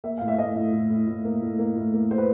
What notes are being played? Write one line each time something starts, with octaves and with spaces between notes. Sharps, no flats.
A#3 E5
A2 F5
E5
A2 D#5
A2
A2
A2
A2
A#3
A2
A#3
A2
A#3
A#3 C5
B4